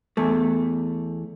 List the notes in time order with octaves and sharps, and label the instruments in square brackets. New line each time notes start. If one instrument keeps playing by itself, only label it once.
[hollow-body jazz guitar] E2 A3